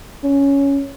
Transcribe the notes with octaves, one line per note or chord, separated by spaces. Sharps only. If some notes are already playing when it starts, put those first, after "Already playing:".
C#4